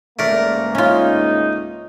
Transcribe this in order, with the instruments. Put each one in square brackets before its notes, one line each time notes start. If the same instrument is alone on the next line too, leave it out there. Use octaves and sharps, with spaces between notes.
[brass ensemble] C#2 G#2 A#3 [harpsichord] A3 A#4 [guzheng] D5
[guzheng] C#4 F4 [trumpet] D#4